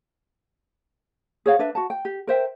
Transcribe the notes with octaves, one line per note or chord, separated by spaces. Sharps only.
G#4 C#5 F5 F#5
D4 B4 E5
F#4 F#5 A5
G5
G4
A#4 C5 E5 G5